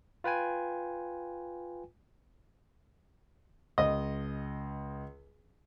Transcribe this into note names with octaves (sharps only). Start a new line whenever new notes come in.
F4 B4 G5 G#5
C#2 D#5